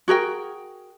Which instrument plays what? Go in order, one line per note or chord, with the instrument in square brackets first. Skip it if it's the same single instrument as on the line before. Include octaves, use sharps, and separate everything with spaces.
[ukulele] F#4 G#4 A#4 G5